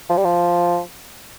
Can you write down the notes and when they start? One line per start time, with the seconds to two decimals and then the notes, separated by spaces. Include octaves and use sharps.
0.10 F3
0.17 G3
0.25 F3